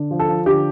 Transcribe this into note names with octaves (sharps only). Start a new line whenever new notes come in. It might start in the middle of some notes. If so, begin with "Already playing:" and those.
Already playing: D3
F3
A4
F3
D3 G4